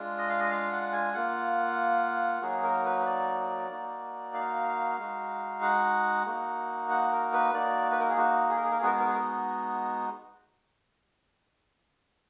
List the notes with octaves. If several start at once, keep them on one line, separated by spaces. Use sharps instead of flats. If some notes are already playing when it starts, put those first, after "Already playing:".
Already playing: G#3 D4 F4
D#5
F5
D#5
F5
F#5
G#5
A#3 F4 F#5
F#3 A#3 D#4 F#4 G#4
A#4
B4
B4
D5
A#3 D#4 F#4
F5
G#3 D#4 F#4
F#5
A#3 D#4 F#4
F#5
A#4
B4
A#3 D#4 F#4 D5
B4
A#4
G#4
F#4
G#4
A#4
G#4
A#4
G#4
G#3 B3 D#4 F#4 A#4
G#4
A#4
G#4
A#4